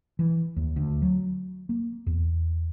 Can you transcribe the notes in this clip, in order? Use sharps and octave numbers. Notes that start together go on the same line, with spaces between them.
E3
D#2
D2
F#3
A#3
E2